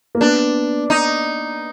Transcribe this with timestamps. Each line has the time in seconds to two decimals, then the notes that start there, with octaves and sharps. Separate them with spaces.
0.15 A#3
0.21 B3 D4
0.90 D#4